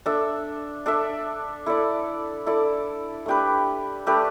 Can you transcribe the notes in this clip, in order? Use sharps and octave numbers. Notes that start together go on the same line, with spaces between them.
D4 A4 E5
D4 A4 E5
E4 A4 D5
E4 A4 D5
A3 D4 G4 B4
A3 D4 G4 B4